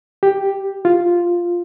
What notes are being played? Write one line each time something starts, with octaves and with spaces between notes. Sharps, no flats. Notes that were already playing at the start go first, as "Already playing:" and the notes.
G4
F4